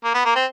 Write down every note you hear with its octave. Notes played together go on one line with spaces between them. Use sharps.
A#3
B3
A#3
C4